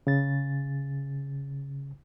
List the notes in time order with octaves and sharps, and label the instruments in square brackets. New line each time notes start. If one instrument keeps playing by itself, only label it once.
[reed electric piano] C#3 A6